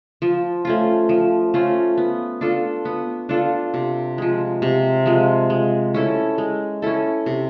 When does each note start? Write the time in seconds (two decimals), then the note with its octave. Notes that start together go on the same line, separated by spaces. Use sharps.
0.22 F3
0.65 A3 C#4 F4
1.09 F3
1.54 A3 C#4 F4
1.98 B3
2.41 D4 F4 A4
2.85 B3
3.29 D4 F4 A4
3.74 C3
4.18 F3 G#3
4.62 C3
5.06 F3 G#3
5.50 G#3
5.94 C#4 E4 A4
6.38 G#3
6.82 C#4 E4 A4
7.26 C3